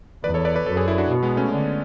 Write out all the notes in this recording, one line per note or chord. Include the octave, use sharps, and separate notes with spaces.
E2 B4 D5
A4 C#5
B4 D5
B4 D5
F#2 A4 C#5
G#4 B4
E4 G#4
D4 F#4
B2
G#3 B3
A3 C#4
D3